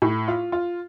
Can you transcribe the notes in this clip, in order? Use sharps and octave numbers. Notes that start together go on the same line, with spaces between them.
A2
F4
F4